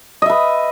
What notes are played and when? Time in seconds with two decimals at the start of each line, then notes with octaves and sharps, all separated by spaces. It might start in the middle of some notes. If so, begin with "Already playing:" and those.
0.22 D#5
0.26 E5
0.30 B4